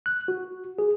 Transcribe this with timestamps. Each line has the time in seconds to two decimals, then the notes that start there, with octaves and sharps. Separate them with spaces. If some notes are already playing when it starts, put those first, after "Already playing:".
0.06 F#6
0.28 F#4
0.79 G#4